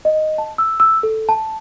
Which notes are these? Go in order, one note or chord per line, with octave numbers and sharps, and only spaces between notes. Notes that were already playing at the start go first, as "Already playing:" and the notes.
D#5
A5
E6
E6
A4
A5